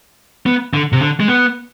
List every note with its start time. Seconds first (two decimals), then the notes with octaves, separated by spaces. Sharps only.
0.46 B3
0.74 D3
0.92 C3
1.01 D3
1.20 G#3
1.28 B3